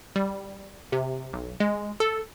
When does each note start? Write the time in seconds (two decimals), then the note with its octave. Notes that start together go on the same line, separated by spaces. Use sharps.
0.16 G3
0.92 C3
1.33 B1
1.60 G#3
2.00 A4